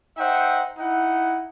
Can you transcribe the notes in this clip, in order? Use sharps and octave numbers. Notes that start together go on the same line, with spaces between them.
D#4 C5 E5 F#5 G5
D#4 E4 F#5